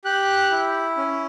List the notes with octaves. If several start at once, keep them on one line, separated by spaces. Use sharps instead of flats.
G4 F#6
E4
C#4